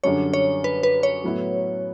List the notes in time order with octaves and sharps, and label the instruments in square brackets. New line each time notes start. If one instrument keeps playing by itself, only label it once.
[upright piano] F#2 D3 G3 D4 [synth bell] C#5
[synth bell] C#5
B4
B4
C#5
[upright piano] A2 F#3 B3 E4